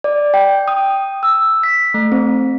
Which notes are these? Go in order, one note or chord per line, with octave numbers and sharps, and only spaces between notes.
D5
G5
D#6
E6
B6
A3
C4